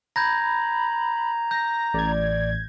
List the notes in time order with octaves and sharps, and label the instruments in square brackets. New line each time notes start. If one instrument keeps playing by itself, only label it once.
[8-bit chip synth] A#5 [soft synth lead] B5 [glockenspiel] G6 G#6 A#6
[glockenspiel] G6 [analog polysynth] A#6
[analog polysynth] A1 G#6 [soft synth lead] D5